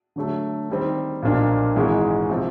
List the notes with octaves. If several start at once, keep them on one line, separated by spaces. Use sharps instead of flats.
D3 F#3 A3
D#3 G3 C4
B1 A#2 F3 A#3 D4
G#1 G#2 E3 G#3
C3 F3